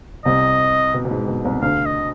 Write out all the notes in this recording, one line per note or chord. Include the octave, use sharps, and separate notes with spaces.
C2 C3 D#5
B2
B2
G#2
B2
C2 C3
D2 D3 F5
D#5